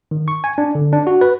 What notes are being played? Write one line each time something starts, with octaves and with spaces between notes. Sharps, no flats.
D#3
C#6
G#5
D4
D3
D4
F#4
B4